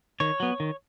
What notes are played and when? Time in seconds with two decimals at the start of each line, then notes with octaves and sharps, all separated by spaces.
0.20 D#3 C#5
0.40 F#3 B3
0.60 D#3